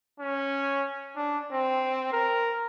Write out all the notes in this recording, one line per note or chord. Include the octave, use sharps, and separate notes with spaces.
C#4
D4
C4
A#4